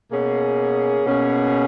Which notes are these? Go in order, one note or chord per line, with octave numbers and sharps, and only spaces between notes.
B2 A#3 C#4 G#4
B2 A#3 C#4 G#4